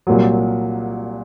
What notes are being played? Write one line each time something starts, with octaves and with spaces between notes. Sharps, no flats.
C2 A#2 F#3